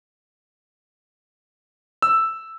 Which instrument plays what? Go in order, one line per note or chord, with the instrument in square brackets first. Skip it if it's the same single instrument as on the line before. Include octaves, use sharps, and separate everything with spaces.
[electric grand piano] E6